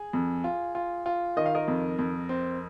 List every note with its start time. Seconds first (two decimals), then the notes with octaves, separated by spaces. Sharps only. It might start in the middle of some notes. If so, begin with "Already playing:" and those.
Already playing: G#4
0.13 F2
0.44 F4
0.75 F4
1.06 F4
1.36 D#3 D#5
1.46 F5
1.55 A#4 D#5
1.68 F2
1.99 F2
2.29 C4